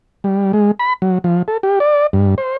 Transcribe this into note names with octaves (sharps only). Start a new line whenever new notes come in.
G3
G#3
B5
F#3
F3
A4
G4
D5
G2
C5